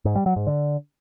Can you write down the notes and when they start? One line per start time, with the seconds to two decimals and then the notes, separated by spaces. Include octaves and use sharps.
0.05 G#2
0.16 G3
0.26 F#3
0.36 G#2
0.47 D3